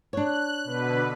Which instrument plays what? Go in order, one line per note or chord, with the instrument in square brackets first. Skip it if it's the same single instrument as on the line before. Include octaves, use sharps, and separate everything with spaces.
[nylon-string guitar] D4 C#5 [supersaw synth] F#6
[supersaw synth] B2 D3 B4